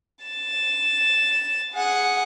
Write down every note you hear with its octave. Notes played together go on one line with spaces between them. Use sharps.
A6 E7
G#4 F#5